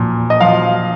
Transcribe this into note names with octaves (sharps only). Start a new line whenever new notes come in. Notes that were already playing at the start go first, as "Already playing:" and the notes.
Already playing: A#2 F3
D#5
F3 F5